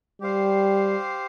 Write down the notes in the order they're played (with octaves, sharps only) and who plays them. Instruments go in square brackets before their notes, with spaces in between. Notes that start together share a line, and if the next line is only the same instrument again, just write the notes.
[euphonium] G3 [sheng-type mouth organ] G4 C5 F5